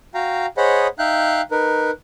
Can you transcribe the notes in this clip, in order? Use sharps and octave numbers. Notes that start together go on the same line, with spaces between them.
F#4 F5 G5 A#5
G#4 C5 C#5 D#5 F#5 B5
D#4 E5 F5 G5 F#6 G6
D#4 A#4 B4